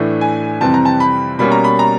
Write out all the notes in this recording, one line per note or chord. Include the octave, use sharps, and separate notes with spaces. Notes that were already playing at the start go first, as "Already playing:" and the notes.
Already playing: A2 E3 A3 D4
G#5
F2 C3 E3 G3 C4 A5
A#5
A5
B5
B2 G3 A#3 C#4 B5
A#5
B5
A#5